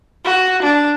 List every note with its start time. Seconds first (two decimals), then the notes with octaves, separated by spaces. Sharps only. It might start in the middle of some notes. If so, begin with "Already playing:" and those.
0.25 F#4
0.62 D4